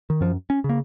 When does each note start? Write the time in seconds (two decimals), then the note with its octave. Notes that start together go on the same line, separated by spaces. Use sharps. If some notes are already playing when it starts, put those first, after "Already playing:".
0.10 D#3
0.21 F#2 F3
0.50 C#4
0.64 C#3
0.69 A#3